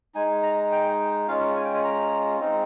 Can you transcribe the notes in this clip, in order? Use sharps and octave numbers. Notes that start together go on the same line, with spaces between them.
G#3 D#4 G#5
A#5
G5
G#3 C#4 F4 F5
G#5
G5
G#5
A#5
G#3 C4 D#4